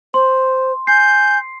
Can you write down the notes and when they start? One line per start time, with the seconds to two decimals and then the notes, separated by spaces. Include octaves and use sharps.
0.14 C5 C6
0.87 G#5 G6 C7